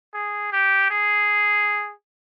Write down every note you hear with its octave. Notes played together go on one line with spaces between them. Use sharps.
G#4
G4
G#4